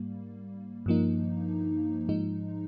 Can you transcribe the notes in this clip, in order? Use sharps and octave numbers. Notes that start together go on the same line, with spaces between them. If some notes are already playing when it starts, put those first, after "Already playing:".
Already playing: G#2 G3 A#3
G2 F3 A#3 D#4
G#2 F3 G#3 D#4